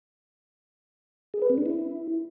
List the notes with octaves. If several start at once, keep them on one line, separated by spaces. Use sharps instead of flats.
G#4
B4
C4
D4
E4